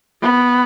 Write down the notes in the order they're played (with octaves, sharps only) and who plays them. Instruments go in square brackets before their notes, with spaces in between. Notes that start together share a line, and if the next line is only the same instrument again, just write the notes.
[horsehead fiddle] B3